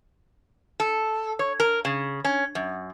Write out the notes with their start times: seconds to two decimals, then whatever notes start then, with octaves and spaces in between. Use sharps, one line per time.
0.80 A4
1.39 C#5
1.60 A#4
1.85 C#3
2.25 C#4
2.55 F#2